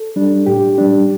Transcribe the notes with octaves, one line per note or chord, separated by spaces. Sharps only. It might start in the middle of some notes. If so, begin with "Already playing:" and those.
Already playing: A4
G3 D4
A2 G4
G3 D4